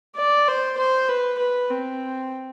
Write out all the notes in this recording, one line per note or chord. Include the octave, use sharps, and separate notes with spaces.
D5
C5
C5
B4
B4
C4